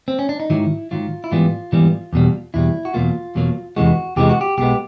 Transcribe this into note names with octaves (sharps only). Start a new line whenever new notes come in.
C4
C#4
D4
D#4
G#2 D#3 F#3 E4
G#2 D#3 F#3 F4
E4
G#2 E3 G3 B3 F4
G#2 E3 G3 B3
E2 B2 G3
E2 B2 G3 E4
F#4
E2 B2 F#3 A#3 F4
E2 B2 F#3 A#3
E2 C3 E3 G#3 F#4
E2 C3 E3 G#3 G4
F#4
G4
B1 B2 G#3 B3 G4